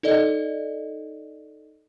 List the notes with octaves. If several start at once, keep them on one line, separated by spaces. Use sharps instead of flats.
D#4 A4 D5 D#5